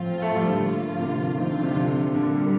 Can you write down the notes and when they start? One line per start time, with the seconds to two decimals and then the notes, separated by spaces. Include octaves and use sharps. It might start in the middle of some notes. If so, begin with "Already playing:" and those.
Already playing: A2 F3 C4 F4
0.22 A3
0.35 G3
0.48 D3
0.61 A2 F3 A#3 F4
1.00 C3
1.08 D3
1.16 C3
1.37 D#3 F3 C4 F4
1.50 D3
1.63 C3
1.76 D3
2.14 A#2 D3 G3 A#3